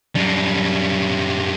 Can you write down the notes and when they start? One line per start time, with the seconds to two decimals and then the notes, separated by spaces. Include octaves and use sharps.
0.15 F#2 G3